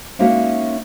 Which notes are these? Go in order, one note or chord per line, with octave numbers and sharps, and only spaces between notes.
G#3 A#3 C#4 D#4 F#4 E5